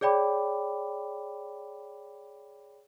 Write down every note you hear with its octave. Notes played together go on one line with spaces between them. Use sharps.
G#4 C#5 D5 G5 B5 D6